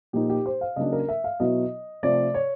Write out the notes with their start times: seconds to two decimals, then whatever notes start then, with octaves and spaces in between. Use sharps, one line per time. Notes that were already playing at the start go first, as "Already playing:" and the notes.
0.13 A#2 F3 A#3 D#4 G4
0.30 G4
0.46 C5
0.61 F5
0.76 C#3 F#3 A#3 D4 D#5
0.92 A#4
1.08 E5
1.24 F5
1.40 B2 F#3 B3 E4 D#5
2.03 C3 F3 A3 D5
2.34 C#5